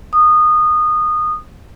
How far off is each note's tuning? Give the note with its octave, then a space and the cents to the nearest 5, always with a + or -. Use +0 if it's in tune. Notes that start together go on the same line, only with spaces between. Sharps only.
D#6 -20